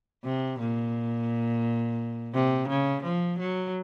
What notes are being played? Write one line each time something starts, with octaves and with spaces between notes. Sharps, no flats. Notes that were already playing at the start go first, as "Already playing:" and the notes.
C3
A#2
C3
C#3
F3
F#3